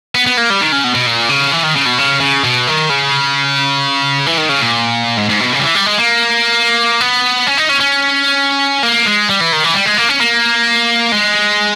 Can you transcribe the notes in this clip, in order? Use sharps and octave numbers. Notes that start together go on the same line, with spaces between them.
B3
B3
A#3
G3
D#3
C#3
B2
B2
A#2
C#3
E3
D#3
C#3
B2
C#3
C#3
B2
D#3
C#3
E3
D#3
C#3
A#2
G#2
G#2
B2
C#3
G3
E3
G3
G#3
A#3
B3
C#4
D#4
C#4
C#4
A#3
G#3
G3
E3
D#3
E3
G3
G#3
A#3
C#4
A#3
G#3